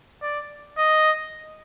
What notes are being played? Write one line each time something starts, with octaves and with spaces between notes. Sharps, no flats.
D5
D#5